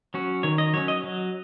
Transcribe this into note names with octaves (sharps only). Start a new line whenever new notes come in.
F#3 C#4 F#4
D#3 C#5
D#5
F#3 C#4 C#5
D#5
F#3